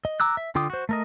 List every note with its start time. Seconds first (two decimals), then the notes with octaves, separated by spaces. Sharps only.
0.05 D#5
0.20 A#5 D6 E6 F#6
0.37 E5
0.55 D3 F4 G5 D6 D#6
0.70 F#4 C5
0.89 A3 A#4 D#5